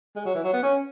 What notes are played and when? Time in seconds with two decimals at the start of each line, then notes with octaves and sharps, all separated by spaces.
0.16 G#3
0.25 F#3
0.35 E3
0.44 F#3
0.53 B3
0.62 C#4